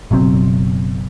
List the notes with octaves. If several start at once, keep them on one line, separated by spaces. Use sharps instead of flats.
F#1 B2 F#3 C4